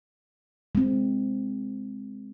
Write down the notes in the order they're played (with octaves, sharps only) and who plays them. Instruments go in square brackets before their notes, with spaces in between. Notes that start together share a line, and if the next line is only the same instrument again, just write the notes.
[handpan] G#3 C4